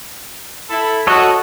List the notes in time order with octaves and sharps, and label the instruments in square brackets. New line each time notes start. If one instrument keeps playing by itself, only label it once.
[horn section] E4 A4 B5
[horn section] F#4 [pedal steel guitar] A4 C#5 D#5